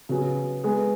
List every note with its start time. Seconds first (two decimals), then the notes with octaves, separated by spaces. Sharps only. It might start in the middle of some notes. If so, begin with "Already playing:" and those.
0.09 C#3 F#3 B3 G#4
0.63 G#3 B3 G#4 B4